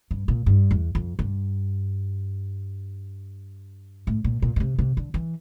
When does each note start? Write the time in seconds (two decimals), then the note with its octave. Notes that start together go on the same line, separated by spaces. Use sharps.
0.11 G2
0.28 A#2
0.46 G2
0.71 E2
0.95 F2
1.19 G2
4.07 A2
4.24 A#2
4.42 A#2
4.56 A#2
4.60 C3
4.79 C3
4.97 D3
5.14 E3